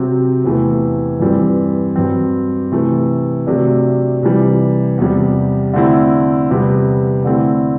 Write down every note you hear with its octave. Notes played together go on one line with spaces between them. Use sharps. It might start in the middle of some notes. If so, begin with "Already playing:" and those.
Already playing: C3 F#3 C4
E2 C3 E3 A3
G2 E3 G3 C4
G2 F#3 C4
C3 E3 A3
C3 F#3 A3 D4
C3 E3 G3
E2 C3 G3
D3 A3 C4 E4
E2 C3 G3 B3
D3 A3 C4 E4